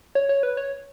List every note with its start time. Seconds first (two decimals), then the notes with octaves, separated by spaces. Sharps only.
0.15 C#5
0.29 C#5
0.43 B4
0.57 C#5